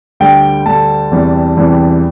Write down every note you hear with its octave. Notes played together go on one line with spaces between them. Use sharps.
D2 D3 G3 G5
D2 D3 G3 A5
E2 C3 E3 G3
E2 C3 E3 G3